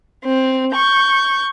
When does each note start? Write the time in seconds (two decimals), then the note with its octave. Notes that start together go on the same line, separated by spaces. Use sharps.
0.24 C4
0.74 C#6 G6